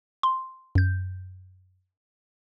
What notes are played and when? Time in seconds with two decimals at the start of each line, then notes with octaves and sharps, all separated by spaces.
0.23 C6
0.75 F#2 G6